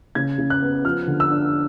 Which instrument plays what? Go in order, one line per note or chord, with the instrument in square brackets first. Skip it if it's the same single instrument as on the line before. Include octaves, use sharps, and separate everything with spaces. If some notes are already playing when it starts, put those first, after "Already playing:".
[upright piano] C#3 G#6
C#3
F#6
B3
F3 F6
D3
E6
D4